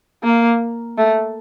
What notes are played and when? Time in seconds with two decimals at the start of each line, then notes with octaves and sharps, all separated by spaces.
0.24 A#3
0.98 A3